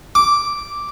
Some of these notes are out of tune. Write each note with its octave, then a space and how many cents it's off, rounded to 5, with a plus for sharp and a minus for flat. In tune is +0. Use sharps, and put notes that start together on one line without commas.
D6 -5